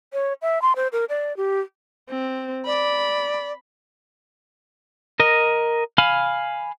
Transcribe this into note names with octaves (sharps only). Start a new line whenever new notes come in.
C#5
E5
C6
C5
A#4
D5
G4
C4
D5 B5
A#4 D#5
F5 G#5 B5 F6